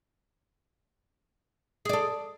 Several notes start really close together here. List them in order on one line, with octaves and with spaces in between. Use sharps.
G#4 D5 A4